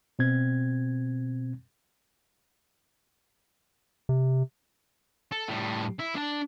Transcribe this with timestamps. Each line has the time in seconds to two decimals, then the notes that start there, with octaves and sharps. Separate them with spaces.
0.19 B2 C4 G#6
4.09 C3
5.32 A4
5.49 A2 G3
6.00 E4
6.16 D4 A5